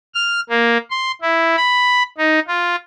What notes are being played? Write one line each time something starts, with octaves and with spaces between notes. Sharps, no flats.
F6
A#3
C6
E4
B5
D#4
F4